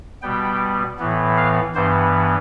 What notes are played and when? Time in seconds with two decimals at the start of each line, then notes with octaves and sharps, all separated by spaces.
0.22 B2 G3 B3 G5
0.99 A2 E3 B3
1.37 F5
1.75 G2 E3 B3 C5